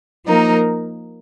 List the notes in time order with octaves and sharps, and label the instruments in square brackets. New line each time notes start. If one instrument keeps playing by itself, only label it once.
[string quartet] F3 A#3 D#4 A#4